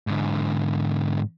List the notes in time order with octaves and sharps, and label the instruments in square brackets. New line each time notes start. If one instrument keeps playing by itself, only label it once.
[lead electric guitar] G#2 D3